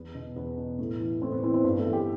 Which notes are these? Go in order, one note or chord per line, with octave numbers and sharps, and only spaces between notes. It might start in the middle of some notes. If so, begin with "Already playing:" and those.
Already playing: E2 B3
B2
E2 B3
B2
A2
E3
A2 C4
B3
E3 C4
C4
G2 B3
A3
E3
G4